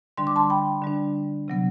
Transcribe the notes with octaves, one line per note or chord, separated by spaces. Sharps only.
D3 G3 D4 C6
D6
A5 C6
G5 B5
D3 G3 D4
C3 F#3 B3